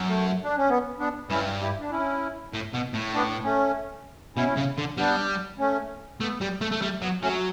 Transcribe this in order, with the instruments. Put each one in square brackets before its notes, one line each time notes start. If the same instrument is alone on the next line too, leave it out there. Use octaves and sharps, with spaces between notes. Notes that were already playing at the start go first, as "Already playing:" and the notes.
Already playing: [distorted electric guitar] F#2
[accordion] A3
D4
C#4
B3
B3 D4
[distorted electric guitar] G2 [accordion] C#4 E4
[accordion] E4 G4
D4
C#4 E4
[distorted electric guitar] A2
B2
A2
[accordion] B3 D4
A3 C#4
[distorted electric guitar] B2 [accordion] C#4 E4
[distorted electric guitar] C#3
D3
[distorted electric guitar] G3 [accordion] B3 D4
[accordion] A3 C#4
[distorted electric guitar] A3 [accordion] B3
[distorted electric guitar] G3
A3
A3
[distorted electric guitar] G3 [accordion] A3
[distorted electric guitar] F#3 [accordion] B3
[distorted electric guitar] F#3 [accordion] A3 C#4